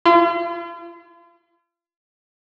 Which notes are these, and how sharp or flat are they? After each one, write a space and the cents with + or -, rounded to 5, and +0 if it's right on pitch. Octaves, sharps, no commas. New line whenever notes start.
F4 -40